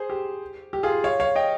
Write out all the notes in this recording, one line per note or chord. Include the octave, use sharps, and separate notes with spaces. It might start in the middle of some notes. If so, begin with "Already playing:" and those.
Already playing: G#4 C5
G4
G4
F4 G#4
C#5 F5
C#5 F5
D#5 G5